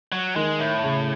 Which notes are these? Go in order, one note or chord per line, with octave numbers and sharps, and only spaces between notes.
F#3
D#3 G#3
A2
C#3